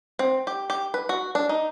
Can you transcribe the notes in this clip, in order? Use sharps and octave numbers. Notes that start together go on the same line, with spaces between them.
C4
G4
G4
B4
F#4
D4
D#4